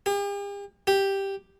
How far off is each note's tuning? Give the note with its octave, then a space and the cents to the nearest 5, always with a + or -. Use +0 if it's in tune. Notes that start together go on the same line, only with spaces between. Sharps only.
G4 +45
G4 +0